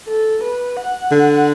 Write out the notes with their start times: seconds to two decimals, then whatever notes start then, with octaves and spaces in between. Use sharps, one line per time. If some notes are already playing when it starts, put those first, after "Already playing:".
0.08 A4
0.44 B4
0.77 F#5
1.11 D3